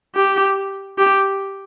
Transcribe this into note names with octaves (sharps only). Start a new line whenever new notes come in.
G4
G4